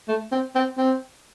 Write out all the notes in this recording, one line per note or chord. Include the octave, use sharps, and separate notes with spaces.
A3
C4
C4
C4